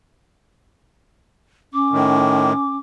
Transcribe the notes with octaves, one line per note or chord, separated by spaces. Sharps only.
C#4 D6
A2 D#3